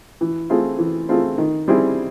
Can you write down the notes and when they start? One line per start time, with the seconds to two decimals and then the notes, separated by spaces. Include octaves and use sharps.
0.21 E3
0.50 A3 C4 F4 G#4
0.79 E3
1.09 A3 C4 F4 G#4
1.38 D#3
1.68 G3 C4 E4 G#4